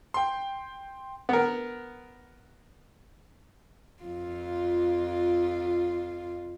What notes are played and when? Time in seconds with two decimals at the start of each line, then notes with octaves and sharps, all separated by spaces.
0.14 G5 C6
1.29 B3 A#4
4.03 F2 F4